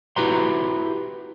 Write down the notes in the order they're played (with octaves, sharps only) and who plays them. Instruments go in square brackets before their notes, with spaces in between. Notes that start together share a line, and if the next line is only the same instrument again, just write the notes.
[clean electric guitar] E4 F#4 G4 B4 A#5 C6